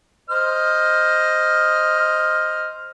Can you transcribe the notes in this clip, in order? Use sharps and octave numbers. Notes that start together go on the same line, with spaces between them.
C5 D#5 F6